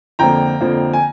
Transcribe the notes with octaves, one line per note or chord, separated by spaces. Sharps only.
F2 D3 F3 A#3 G5 A#5
F2 D3 F3 A#3
G#5